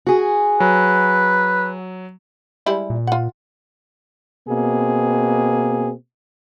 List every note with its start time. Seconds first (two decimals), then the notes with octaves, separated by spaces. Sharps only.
0.07 F#4 G#4
0.60 F#3 B4
2.66 G3 G#3 E4
2.90 A#2
3.07 F4 F#5
4.49 B2 A#3 C4 G#4